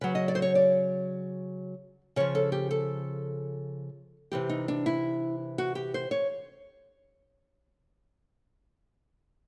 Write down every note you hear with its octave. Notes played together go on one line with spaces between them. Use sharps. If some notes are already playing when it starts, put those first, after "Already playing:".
C#3 F#3 B4
D#5
D5
C5
C#5
D5
C#3 F3 C#5
A4
G4
A4
C3 E3 G4
D#4
D4
E4
F#4
G4
C5
C#5